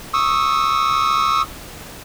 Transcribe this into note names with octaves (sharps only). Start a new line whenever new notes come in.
C#6 D#6 E6